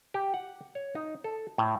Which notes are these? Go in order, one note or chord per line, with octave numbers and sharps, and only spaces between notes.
G4
F#5
C#5
D#4
A4
A2